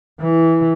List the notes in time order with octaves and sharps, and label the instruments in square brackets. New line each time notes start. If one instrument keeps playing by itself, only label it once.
[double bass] E3